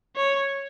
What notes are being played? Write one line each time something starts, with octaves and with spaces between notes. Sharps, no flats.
C#5